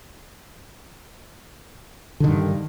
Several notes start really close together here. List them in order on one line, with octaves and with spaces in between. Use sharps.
D3 D#3 G2